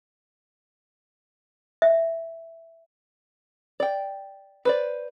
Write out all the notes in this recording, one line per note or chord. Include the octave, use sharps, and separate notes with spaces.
E5
D5 G5
B4 C5 D5